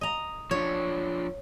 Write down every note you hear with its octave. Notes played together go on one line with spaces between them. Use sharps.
D#5 A#5
F3 D4 C#5